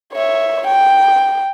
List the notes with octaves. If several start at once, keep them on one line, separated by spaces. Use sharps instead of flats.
C#5 E5
G5